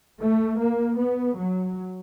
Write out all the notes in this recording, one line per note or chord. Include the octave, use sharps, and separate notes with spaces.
A3
A#3
B3
F#3